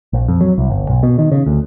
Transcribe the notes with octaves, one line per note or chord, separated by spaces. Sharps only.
A#1
F2
F#3
C2
G1
B1
B2
D#3
C#3
D2